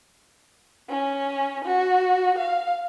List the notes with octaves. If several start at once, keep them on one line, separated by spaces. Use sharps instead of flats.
C#4
F#4
F5